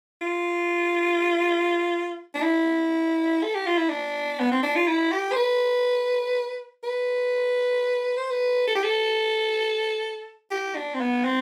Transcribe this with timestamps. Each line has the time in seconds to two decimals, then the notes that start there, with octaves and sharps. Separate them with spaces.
0.21 F4
2.34 D4
2.42 E4
3.43 A4
3.54 G4
3.66 F4
3.77 E4
3.89 D4
4.40 B3
4.51 C4
4.63 D4
4.76 F4
4.87 E4
5.12 G4
5.32 C5
5.36 B4
6.83 B4
8.17 C5
8.30 B4
8.67 A4
8.75 G4
8.84 A4
10.51 G4
10.75 D4
10.94 C4
11.00 B3
11.24 C4